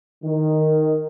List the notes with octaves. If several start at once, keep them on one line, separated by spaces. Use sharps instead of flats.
D#3